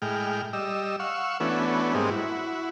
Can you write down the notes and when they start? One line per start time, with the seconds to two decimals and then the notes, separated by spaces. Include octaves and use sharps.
0.02 A2 G#3 G5 F6
0.53 G3 D#5 E6
1.00 F5 F#5 C#6 E6
1.40 E3 A3 B3 C#4 D4 F#4
1.94 G#2 G3 G#3 A#3 C4 D#6
2.10 E4 F#4